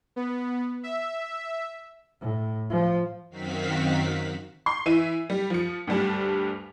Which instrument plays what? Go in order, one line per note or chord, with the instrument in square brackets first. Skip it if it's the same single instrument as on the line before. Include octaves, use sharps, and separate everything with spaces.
[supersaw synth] B3
E5
[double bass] A2
F3
[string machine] F#2 D#3 C4 F#4 F5 B6
[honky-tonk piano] C6 C#6 C7
E3 E4 E5 D#7
G3
F3 C#7
D2 G2 G3 A5